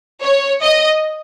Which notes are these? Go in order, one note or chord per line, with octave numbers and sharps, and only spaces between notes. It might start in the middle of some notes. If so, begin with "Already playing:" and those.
C#5
D#5